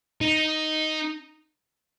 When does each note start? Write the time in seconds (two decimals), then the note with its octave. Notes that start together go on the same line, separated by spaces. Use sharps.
0.21 D#4